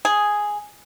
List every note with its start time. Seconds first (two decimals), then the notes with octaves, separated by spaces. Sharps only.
0.05 G#4